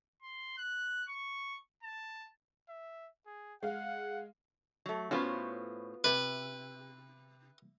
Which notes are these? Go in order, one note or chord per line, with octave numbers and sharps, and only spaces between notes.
C6
F#6
C#6
A5
E5
G#4
G#3 F5 F#5
F#3 A3
A2 B3 C#4 F4 F#4 C5
C3 B4